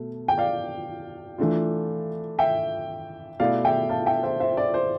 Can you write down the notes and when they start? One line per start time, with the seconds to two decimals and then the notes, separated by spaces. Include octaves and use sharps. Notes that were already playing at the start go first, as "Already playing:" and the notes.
Already playing: B2 A3
0.28 G5
0.38 D5 F5
1.38 E3 A3 D4 F4
2.39 E5 G5
3.40 B2 A3 E4 D5 F5
3.65 E5 G5
3.89 F5 A5
4.06 E5 G5
4.23 C5 E5
4.40 C5 E5
4.57 D5
4.74 C5